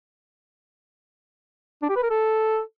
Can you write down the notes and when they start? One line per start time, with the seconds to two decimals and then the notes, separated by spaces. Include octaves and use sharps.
1.82 D4
1.89 G4
1.96 B4
2.03 A#4
2.10 A4